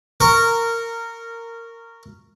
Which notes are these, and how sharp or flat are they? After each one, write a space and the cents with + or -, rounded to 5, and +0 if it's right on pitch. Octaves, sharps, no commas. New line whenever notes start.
A#4 -15 C#6 +0